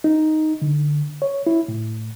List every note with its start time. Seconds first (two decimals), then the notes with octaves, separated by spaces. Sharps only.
0.04 D#4
0.62 D3
1.22 C#5
1.47 E4
1.68 A2